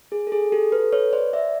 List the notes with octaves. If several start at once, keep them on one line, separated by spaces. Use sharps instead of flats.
G#4
A4
G#4
G4 A4
A4 B4
B4 C#5
C5 D5
D5 E5